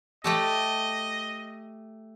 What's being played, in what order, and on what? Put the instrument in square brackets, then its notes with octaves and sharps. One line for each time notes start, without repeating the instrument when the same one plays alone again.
[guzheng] A3 G4 A4 [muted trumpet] D#5